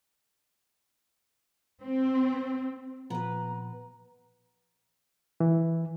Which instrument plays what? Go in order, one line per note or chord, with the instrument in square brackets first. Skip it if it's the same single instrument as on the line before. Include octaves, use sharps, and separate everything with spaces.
[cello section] C4
[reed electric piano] A#2 F3 [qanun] B3 B4 [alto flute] A#5
[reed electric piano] E3